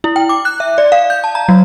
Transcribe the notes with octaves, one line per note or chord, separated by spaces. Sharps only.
E4
G5
D6
F#6
E5
D5
F5
G6
A5
A#5
F#3